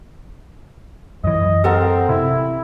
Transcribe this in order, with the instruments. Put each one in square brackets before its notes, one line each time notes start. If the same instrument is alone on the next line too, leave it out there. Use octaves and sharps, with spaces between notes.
[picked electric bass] F#2 E3 [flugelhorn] D#5
[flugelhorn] C4 [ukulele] A4 A#4 F#5
[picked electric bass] C3 [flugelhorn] E4